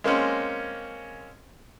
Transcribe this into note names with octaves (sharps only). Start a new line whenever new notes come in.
G#3 A#3 C4 C#4